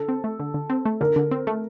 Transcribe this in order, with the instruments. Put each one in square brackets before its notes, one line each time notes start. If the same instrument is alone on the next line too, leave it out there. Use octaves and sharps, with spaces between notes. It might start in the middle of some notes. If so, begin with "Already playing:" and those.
Already playing: [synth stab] D3 [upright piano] A4
[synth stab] C4
A3
D3
D3
C4
A3
[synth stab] D3 [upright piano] A#4
[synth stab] D3
C4
A3